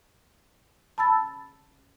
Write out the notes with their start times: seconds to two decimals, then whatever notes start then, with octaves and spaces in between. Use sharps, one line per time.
0.98 A5 B5 E6 A6